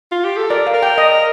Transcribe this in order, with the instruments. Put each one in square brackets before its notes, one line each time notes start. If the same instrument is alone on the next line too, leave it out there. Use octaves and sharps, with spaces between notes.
[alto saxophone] F4
G4
A4
[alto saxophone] A#4 [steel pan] D5
[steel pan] F5
[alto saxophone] A#4
[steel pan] G5
D#5